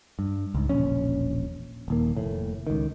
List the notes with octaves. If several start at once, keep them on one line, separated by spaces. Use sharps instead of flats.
G2
C#2 G#2
E1 A#1 C#4
D#1 D#2 A#3
F1 A2
C#2 D#3